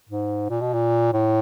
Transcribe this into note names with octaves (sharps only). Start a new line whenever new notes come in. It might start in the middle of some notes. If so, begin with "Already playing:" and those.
G#2
A#2
B2
A#2
A2